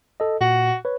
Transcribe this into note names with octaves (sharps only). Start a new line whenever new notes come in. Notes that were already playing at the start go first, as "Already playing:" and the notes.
A4 D#5
A#2 F#4
B4 C#5